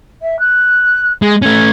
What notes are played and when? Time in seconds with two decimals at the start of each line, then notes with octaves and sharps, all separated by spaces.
0.21 E5
0.39 F#6
1.22 G#3 G#4
1.42 A3 C#4 G#6